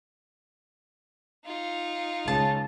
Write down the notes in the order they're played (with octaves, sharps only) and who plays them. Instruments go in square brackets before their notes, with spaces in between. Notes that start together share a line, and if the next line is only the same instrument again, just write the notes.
[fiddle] D#4 F4
[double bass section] C#2 [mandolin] A5